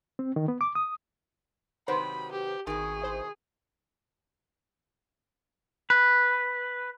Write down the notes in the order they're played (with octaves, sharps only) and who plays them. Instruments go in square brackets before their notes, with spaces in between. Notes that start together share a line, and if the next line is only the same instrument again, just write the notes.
[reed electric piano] C4
D#3
B3
D6
D#6
[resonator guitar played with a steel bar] C3 D#3 F#3 [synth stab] F#4 B4 C5 [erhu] B5
[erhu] G4
[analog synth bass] G#1 [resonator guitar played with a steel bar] B2 D#3 [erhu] G#4
[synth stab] E4 C5
[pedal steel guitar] B4